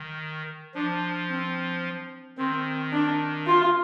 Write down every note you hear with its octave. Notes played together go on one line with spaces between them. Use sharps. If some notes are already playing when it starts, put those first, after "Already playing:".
Already playing: D#3
F3 D4
C4
D#3 C4
D4
F4